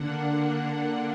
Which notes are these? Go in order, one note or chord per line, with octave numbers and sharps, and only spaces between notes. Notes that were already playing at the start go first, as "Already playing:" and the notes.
Already playing: D3 A#3 D4 F#5
F#5